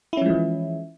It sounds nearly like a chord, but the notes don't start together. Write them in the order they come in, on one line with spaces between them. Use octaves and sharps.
E4 C#4 F3 G#3 E3